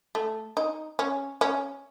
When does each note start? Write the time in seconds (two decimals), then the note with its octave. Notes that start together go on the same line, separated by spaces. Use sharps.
0.15 A3
0.57 D#4
0.99 C#4
1.41 C#4